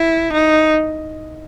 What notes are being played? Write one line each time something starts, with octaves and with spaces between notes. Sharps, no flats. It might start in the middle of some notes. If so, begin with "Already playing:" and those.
Already playing: E4
D#4